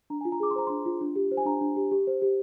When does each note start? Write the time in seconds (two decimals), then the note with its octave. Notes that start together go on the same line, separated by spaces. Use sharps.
0.10 D4 A#5
0.21 G#5
0.25 F4
0.32 A#5
0.40 G#4 D6
0.51 C6
0.56 C5 A#5
0.67 D4 C6
0.86 F4
1.01 D4
1.16 G4
1.31 C5
1.37 G#5
1.45 D4 A#5
1.61 D4
1.76 G4
1.91 G4
2.07 C5
2.22 G4